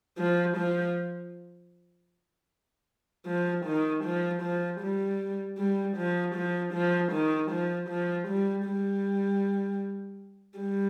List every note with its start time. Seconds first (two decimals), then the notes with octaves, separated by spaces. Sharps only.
0.18 F3
0.57 F3
3.27 F3
3.65 D#3
4.04 F3
4.42 F3
4.81 G3
5.58 G3
5.97 F3
6.35 F3
6.73 F3
7.12 D#3
7.51 F3
7.89 F3
8.28 G3
8.67 G3
10.59 G3